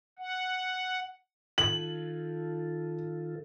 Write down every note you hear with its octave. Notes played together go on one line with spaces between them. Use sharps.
F#5
D#3 F4 A4 F#7